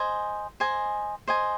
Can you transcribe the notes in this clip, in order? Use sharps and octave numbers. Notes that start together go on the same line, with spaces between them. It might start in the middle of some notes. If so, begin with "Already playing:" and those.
Already playing: C5 D#5 G#5
C5 D#5 G#5
C5 D#5 G#5